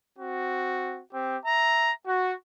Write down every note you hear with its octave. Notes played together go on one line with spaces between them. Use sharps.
C4 F#4
C4 G4
E5 A#5
F#4